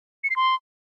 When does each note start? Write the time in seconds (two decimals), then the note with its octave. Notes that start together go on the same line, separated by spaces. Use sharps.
0.24 C#7
0.30 C7
0.36 C6